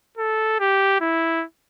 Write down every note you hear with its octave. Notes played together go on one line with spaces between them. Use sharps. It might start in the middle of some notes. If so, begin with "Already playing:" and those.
A4
G4
E4